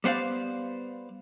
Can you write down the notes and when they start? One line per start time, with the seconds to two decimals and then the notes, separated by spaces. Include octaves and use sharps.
0.04 G3 B3 C5 D5 F5